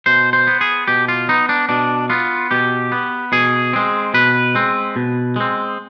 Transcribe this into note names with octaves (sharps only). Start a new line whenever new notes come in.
B2 C5
C5
B3
G#4
B2 G4
F4
B3 D#4
D4
B2 D4
B3 F4
B2 G4
B3
B2 G#4
G#3 C4
B2 B4
G#3 C4
B2
G#3 C4